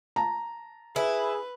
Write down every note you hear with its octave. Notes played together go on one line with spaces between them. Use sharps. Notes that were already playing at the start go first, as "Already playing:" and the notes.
A5 A#5
E4 G#4 B4